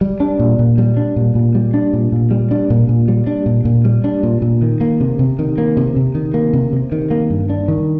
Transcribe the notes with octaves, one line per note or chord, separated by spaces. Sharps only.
G3
D4
A#2
A#2
G3
D4
A#2
A#2
G3
D4
A#2
A#2
G3
D4
A#2
A#2
G3
D4
A#2
A#2
G3
D4
A#2
A#2
D#3
A#3
C3
C3
D#3
A#3
C3
C3
D#3
A#3
C3
C3
D#3
A#3
G2
D4
D#3